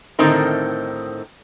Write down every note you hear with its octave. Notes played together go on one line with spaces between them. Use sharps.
A2 D3 D#3 C4 D#4 A#4